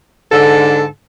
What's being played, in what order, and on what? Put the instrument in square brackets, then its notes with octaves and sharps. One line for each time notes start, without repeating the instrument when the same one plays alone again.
[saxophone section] G#2 D3 A4